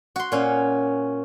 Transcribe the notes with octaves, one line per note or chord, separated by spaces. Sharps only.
F#4 C6
A#2 C#4